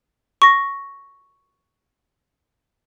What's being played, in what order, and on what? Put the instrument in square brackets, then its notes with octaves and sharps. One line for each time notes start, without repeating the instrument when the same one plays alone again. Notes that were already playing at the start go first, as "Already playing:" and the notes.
[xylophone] C#6 A#6